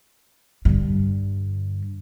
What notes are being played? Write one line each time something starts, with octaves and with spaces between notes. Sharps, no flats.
G2 D3